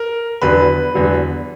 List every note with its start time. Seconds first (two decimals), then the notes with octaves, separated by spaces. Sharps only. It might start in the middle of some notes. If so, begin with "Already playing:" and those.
Already playing: A#4
0.42 E2 D3 F#3 B4
0.94 E2 D3 F#3